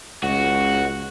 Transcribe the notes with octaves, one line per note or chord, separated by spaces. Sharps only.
C#2 F#4